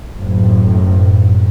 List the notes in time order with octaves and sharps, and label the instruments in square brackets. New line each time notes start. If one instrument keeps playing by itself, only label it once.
[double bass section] F#1 A2